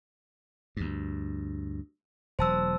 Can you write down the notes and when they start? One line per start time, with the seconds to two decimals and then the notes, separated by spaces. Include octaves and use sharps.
0.77 D2 G2
2.39 E1 F#3 C5 A5 E6